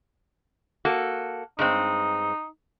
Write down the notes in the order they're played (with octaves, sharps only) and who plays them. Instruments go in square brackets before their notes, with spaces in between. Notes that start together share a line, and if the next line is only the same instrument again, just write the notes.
[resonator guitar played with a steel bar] A#3 F#4 A4
[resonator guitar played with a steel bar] G2 G#3 C4 [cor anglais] D#4